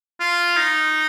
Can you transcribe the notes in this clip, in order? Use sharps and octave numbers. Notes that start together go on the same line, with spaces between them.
F4
D#4